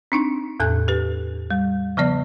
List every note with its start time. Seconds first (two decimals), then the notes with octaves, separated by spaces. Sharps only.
0.12 C4 D4 D#4
0.60 E2 A2 A4 G#5 F#6 G6
0.88 G4 B4
1.51 G3
1.97 C#3 F3 B3 D5 A#6